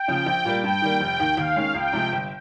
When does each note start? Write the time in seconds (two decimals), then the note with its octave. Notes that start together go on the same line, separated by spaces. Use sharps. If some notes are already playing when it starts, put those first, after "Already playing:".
Already playing: G5
0.08 C#3 F3
0.26 A#1
0.45 A#2 G3 A#3
0.64 G2 G5
0.82 D#3 G3 A#3
1.01 F1 G5
1.20 D#2 D#3
1.37 D#2 F5
1.56 D#3 G#3 C#4
1.75 C#2 G5
1.93 C3 F3 G#3
2.12 G1